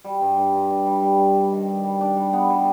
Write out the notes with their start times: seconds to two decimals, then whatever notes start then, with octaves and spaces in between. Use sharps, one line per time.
0.04 G3
0.21 G2
0.37 G2
0.54 G2
0.70 G2
0.87 G3
1.02 G3
1.19 G2
1.35 G3
1.52 D#3
1.68 D#3
1.84 G3
2.01 D4
2.17 G3
2.33 B3
2.50 G3